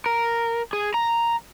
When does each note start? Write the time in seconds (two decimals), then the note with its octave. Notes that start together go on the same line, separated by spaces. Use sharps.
0.06 A#4
0.73 G#4
0.94 A#5